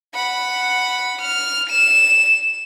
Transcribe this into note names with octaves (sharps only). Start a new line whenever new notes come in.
F#5 B5
F6
E7